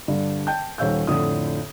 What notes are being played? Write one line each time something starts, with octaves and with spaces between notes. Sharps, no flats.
G2 D3
G5 A5 G6
D#1 D#3 C#5 F5 E6 G6
F2 A2 D3 D#6